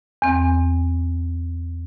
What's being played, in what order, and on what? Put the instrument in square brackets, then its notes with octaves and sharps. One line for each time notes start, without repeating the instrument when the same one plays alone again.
[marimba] E2 C4